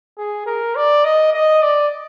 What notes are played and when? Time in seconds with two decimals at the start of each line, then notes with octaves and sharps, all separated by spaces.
0.18 G#4
0.46 A#4
0.76 D5
1.05 D#5
1.33 D#5
1.63 D5